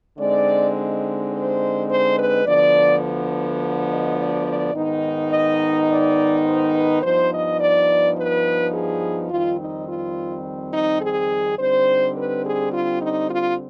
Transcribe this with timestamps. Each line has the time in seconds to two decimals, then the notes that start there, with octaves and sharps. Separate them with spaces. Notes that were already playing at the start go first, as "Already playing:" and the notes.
0.18 D3 G#3 C4 D#4 D5
1.32 C5
1.89 C5
2.18 B4
2.45 D2 D3 F3 B3 D5
3.88 D#5
4.16 D5
4.46 D5
4.73 G#2 D#3 B3 D#4
5.31 D#5
5.88 D5
6.45 C5
6.74 B4
7.02 G2 F3 B3 D#4 C5
7.30 D#5
7.58 D5
8.16 B4
8.73 G#4
9.29 F2 D#3 G3 C4 D#4 F4
9.59 D#4
9.87 F4
10.72 D#4
11.01 G#4
11.57 D3 G3 C4 D#4 C5
12.15 B4
12.44 G#4
12.72 F4
13.00 D#4
13.29 F4